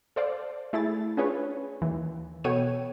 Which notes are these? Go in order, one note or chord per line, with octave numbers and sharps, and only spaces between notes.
A4 C5 D5 F5
A3 E4 G#4 A6
C#4 D4 F4 G#4 B4 C#5
D#2 E3
B2 B3 A4 C#5 G5 D#7